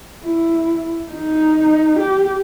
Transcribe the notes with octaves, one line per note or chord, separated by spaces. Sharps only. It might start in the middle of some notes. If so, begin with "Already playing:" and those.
E4
D#4
G4